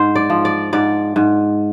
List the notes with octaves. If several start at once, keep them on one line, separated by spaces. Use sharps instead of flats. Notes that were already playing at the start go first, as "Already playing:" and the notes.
Already playing: G#2 C5
D5
F3
D5
G#2 D5
G#2